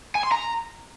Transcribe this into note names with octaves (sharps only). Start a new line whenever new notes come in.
G#5
C6
A#5